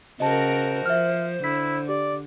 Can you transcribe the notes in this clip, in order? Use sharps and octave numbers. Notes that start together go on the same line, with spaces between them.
C#3 F#4 A#4 C5 D#5 A5
F3 E5 F6
D3 E4 B6
G4 D5